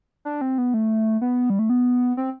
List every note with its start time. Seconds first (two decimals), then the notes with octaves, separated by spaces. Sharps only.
0.25 D4
0.41 C4
0.58 B3
0.74 A3
1.21 B3
1.50 G3
1.59 A3
1.70 B3
2.17 C4